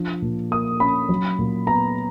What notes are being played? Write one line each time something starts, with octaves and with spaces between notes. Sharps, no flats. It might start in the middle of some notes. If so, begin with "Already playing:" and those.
Already playing: F3 D4
A#2
A#3 D#6
C#4 B5
F#3
A#2
B3 A#5